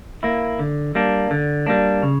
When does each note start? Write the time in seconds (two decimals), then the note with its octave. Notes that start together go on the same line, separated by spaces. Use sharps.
0.23 A#3 E4
0.59 D3
0.95 G3 A#3 D4
1.31 D3
1.67 G3 A#3 D4
2.03 C#3